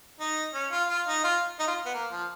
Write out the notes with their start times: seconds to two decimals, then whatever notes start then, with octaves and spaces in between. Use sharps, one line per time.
0.20 D#4
0.54 C#4
0.72 F4
0.89 F4
1.07 D#4
1.24 F4
1.60 D#4
1.67 F4
1.85 B3
1.94 A#3
2.11 F3